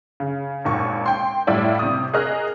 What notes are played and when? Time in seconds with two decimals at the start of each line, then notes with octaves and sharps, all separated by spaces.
0.20 C#3
0.64 G#1 D#2 A#2 C#6
1.06 G5 C6
1.47 A2 G3 A3 E4 F4 D5
1.79 C3 D#6
2.14 G#4 A#4 D#5 F6 F#6